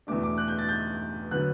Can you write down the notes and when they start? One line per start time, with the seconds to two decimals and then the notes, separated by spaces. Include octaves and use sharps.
0.07 E2 B2 A3 D4 D6
0.23 D6
0.38 F#6
0.48 G6
0.59 A6
0.69 G6
1.31 D3 F#3 B3 F#6